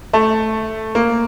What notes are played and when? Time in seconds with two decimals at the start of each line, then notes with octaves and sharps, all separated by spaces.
0.13 A3
0.95 A#3